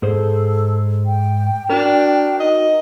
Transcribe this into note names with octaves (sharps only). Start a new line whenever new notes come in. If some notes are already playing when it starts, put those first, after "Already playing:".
G#2 G#4 A4 C5
G5
D4 F#4 A#4
D#4 D#5